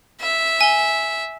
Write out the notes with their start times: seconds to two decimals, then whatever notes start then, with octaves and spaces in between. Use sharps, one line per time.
0.21 E5
0.61 G#5 G7